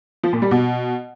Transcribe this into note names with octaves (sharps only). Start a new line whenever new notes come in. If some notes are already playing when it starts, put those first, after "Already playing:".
F3
A#2
G3
B2